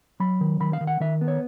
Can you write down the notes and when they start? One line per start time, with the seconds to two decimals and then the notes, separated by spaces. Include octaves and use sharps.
0.20 F#3 B5
0.41 D#3
0.60 D#3 B5
0.73 F5
0.81 D#3
0.87 F#5
1.00 D#3 E5
1.21 B3
1.28 C#5